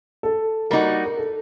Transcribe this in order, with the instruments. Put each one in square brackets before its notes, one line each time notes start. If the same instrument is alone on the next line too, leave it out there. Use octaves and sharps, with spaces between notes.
[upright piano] A4
[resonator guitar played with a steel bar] G3 A#3 D#4 F#4 [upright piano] A#4
[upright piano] A#4
A4